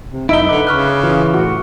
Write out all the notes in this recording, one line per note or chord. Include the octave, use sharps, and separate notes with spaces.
C3
F#2 D#4 E4 E5 D7 G7
D3 B4 D6
C#3 C#6 F6 F#6
E3 F4
A2 F#4